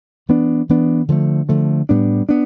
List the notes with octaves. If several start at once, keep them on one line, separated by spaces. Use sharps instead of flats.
E3 B3 D4
E3 B3 D4
D3 F3 A3
D3 F3 A3
A2 G3 B3 D4
B3 D4